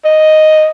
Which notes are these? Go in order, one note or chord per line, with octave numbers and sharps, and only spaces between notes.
D#5